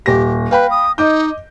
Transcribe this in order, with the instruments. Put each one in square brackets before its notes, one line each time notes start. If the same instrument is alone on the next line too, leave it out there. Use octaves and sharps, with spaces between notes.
[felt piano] D#1 A#6 [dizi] G4
[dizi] B4 [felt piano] F5 G5 B5
[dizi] D#6
[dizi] D#4 [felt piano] D#5 D6 G6